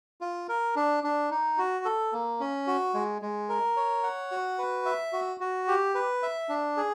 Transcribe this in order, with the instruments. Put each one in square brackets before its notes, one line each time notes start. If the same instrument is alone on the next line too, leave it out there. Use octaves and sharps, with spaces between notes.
[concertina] F4
A#4
D4
D4
D#4
F#4
A4
A#3
C#4
F#4
G#3
G#3
A#4
C#5
F#5
F#4
B4
E5
F#4
F#4
G4
B4
E5
D4
G#4